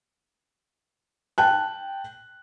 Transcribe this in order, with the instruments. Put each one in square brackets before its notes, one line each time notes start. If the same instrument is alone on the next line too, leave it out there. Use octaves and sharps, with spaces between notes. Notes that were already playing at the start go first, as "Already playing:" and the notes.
[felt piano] G5 A5 F#6